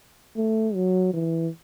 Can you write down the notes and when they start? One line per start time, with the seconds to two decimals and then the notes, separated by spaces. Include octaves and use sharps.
0.37 A3
0.75 F#3
1.13 E3